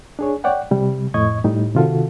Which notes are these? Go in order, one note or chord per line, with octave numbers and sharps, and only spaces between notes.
D4 G#4 C#5
C#5 D5 F#5 G5
C3 G3
F2 A2 D#5 C#6 G#6
A2 G3 D#4
C3 D#3 F4 F#4 A4